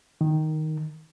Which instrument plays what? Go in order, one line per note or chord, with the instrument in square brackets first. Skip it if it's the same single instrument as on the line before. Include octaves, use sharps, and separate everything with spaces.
[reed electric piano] D#3